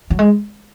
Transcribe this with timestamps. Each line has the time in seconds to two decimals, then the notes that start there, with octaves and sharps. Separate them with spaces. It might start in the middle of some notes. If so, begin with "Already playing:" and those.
0.10 F#3
0.19 G#3